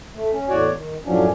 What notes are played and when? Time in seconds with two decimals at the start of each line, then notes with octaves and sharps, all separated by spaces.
0.15 A3
0.33 C#4
0.49 E2 A2 F#4 C#5 D5
0.75 D#3
1.05 F#2 A2 F3 F#3 C#4 D4